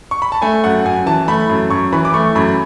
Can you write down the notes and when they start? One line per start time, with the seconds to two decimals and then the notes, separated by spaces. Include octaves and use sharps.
0.11 C#6
0.22 B5
0.32 A5
0.42 A3 G#5
0.64 F#2 F#5
0.85 F#2 G#5
1.06 E3 A5
1.28 A3 B5
1.50 F#2
1.70 F#2 C#6
1.92 E3 B5
2.05 D6
2.14 A3 C#6
2.35 F#2 B5